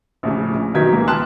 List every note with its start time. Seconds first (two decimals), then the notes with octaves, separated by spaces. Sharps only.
0.23 A#1 A2 C#3
0.55 A#1
0.74 A#1 B2 D#3 F#3 G#6 B6
0.93 C#2 A#2 E3 A#3
1.08 G5 A5 C6 D#6 F6 F#6